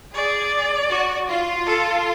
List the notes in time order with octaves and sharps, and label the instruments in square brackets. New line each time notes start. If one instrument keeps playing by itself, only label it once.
[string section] G#4 [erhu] D5
[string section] F#4
F4
[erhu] A4